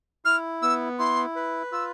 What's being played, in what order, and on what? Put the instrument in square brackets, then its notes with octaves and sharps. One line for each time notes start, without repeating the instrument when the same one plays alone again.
[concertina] E4 [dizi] F6
[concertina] B3 [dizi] E6
[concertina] E4 [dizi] C6
[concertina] B4
[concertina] F4 [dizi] E6